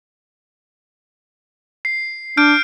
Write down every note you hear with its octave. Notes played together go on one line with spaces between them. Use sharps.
C7
D4 F6 G6 D7